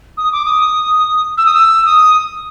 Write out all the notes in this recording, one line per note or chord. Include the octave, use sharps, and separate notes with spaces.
D#6
D6
D#6
E6
D#6
E6
D#6